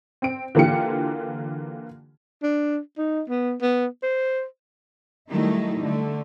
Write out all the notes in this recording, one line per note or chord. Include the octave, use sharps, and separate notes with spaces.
C4 D7
D3 E3 A#3 F4 G4 C#7
D4
D#4
B3
B3
C5
D#3 F#3 G3 A3 D#4 E4
D3 A3